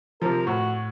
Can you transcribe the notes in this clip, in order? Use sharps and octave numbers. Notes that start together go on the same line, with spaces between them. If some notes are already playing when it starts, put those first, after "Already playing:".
C3 F3 A#4
A2 F#4